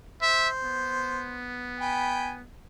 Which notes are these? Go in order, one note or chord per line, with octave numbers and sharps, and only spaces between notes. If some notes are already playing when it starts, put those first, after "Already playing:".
C5 E5
B3
G5 G#5 B5